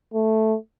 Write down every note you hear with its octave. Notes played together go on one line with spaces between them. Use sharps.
A3